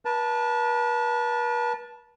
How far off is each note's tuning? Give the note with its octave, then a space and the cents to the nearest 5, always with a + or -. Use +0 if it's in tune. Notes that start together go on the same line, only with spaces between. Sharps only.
B4 -40 A5 +0